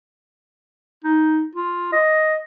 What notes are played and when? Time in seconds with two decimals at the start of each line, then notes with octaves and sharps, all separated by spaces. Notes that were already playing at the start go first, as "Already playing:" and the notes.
1.04 D#4
1.55 F4
1.92 D#5